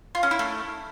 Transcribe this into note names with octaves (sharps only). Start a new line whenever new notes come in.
F4
C#4
E4
A3